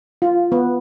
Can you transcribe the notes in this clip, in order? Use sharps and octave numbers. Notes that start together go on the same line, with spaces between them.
F4
B3